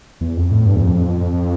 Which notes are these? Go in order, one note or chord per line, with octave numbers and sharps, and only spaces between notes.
E2
F2
A2
G2
E2
F2